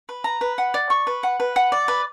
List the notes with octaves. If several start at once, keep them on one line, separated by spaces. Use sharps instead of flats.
B4
A#5
B4
F#5
D5
C#6
B4
F#5
B4
F#5
D5
B4